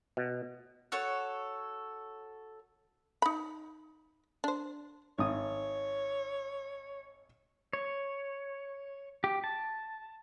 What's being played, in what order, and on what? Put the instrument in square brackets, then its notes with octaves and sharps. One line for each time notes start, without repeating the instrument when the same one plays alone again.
[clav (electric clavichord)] B2
[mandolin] F#4 A4 C#5
[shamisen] D#4 B5
D4 C5
[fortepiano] G#1 D#6 [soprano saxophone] C#5
[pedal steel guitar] C#5
G4
A5